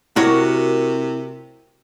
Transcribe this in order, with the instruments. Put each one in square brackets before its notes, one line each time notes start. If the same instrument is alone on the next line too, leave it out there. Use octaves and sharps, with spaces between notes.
[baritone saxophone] C3 [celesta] E4 [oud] F#4 A#4 C#5